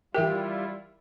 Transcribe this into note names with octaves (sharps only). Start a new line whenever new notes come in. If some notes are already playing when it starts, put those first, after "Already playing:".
E3 G3 E4 F4 G4 A#4 E5 G5